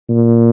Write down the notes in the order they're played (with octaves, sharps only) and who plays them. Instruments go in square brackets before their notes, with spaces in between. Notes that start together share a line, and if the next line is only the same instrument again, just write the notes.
[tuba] A#2